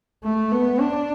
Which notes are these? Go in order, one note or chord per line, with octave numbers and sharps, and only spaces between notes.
A3
B3
D4